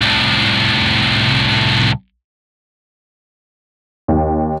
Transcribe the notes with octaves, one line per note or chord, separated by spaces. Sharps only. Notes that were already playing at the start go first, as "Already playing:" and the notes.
C2 A2
D#2